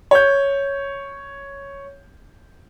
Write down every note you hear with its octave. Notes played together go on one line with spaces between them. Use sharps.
C#5 G6